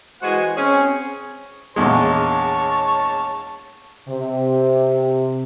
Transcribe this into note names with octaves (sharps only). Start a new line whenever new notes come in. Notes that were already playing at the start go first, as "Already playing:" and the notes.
E3 G#3 F#4 C5 F#5 G#5
C4 C#4 G#4 C#5
A#1 E2 G#3 C#5 A5
C3